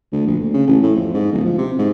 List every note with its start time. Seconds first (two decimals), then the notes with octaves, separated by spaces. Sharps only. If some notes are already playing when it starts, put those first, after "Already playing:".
0.12 D2
0.26 A#1
0.40 D2
0.54 C#3
0.67 A1
0.82 A2
0.96 F2
1.14 G#2
1.32 D1
1.45 F3
1.58 C3
1.78 G#2